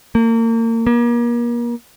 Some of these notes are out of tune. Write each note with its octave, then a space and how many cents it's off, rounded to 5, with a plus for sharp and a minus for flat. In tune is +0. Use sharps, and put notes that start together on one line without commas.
A#3 -35
A#3 +35